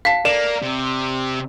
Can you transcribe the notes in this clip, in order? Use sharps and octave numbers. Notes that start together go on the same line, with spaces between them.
F5 A5 B6
A#3 D5 E7
C3